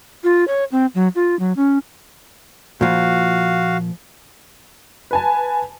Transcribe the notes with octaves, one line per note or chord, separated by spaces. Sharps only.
F4
C#5
C4
F#3
F4
F#3
C#4
A#2 F3 F#4 F5
B4 G#5 A5